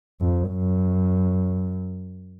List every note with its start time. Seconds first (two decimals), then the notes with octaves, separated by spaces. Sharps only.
0.21 F2
0.50 F#2